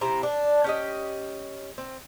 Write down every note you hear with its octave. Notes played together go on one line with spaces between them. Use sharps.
C3 C4 E4 A#5
D4
C#4 G4 D#5
C4